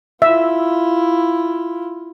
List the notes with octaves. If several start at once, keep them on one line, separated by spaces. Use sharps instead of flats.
E4 F4 E5